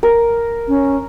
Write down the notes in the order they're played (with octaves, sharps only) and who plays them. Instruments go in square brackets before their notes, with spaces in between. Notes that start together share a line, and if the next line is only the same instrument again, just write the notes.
[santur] A#4
[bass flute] C#4